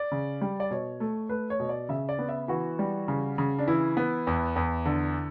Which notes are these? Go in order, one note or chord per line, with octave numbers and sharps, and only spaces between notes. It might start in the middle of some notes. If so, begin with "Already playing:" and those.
Already playing: D5
C#3
G3
D5
B2 C#5
A3
A3 B4
C#5
B2
D5
C#3 E5
D5
B3
E5
E3 F#4
G3
C#3
C#3
D4
E3 E4
B3
E2
E2
D3